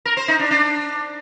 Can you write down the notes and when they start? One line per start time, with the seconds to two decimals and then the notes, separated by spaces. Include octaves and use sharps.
0.05 A#4
0.17 C5
0.28 D#4
0.39 D4
0.51 D4